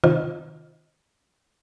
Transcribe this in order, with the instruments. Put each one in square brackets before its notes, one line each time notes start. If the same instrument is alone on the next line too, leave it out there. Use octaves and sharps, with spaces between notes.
[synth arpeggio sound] C3 D#3 F4